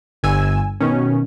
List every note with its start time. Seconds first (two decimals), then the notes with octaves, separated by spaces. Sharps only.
0.23 G1 G#5 E6
0.80 B2 D#3 C#4